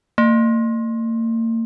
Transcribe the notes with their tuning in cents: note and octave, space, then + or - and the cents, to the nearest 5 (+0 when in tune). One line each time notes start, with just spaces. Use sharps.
A#3 -40